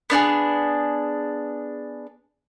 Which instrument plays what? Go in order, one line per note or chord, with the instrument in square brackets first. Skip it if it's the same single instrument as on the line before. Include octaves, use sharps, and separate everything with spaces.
[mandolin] B3 D4 E4 G#4